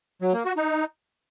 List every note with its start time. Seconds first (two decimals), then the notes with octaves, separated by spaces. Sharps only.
0.22 F#3
0.33 A#3
0.45 F#4
0.57 D#4